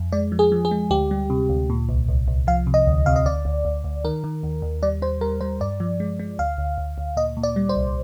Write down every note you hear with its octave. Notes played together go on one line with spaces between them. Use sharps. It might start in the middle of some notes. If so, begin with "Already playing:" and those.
Already playing: F2
G#3 D5
F3
G#4
F3
G#4
G#3
D2 G4
G3
C3
D2
A#2
C2
C2
C2
F3 F5
C3
D#5
D2
C3 F5
D#5
D2 D5
D2
D2
D2
D#3 A#4
D#3
D#2
D#2
G3 D5
G3 C5
G3 A#4
G3 C5
G2 D5
F3
G#3
G#3
D2 F5
D2
D2
D2
A#2 D#5
A#2
D5
G3
C5
C2